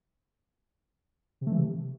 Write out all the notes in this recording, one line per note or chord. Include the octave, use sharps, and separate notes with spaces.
C3
A3
E3
C3